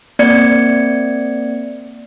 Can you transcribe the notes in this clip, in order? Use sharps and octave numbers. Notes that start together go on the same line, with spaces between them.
A#3 C4 D5 G#6 C#7